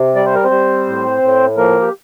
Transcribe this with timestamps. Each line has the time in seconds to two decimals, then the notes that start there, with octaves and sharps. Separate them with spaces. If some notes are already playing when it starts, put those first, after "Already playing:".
Already playing: C3
0.15 G3 D5
0.25 C5
0.35 A#4
0.44 C4 C5
0.51 G3
0.87 A2
1.22 A2
1.57 F3 A#3 A#4
1.82 G4